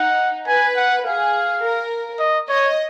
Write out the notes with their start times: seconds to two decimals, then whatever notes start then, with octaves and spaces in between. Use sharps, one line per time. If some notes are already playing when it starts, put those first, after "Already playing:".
Already playing: D#4 F#5
0.47 B4 G#5
0.76 F#5
1.05 G#4 F5
1.62 A#4
2.19 D#5
2.48 C#5 D#5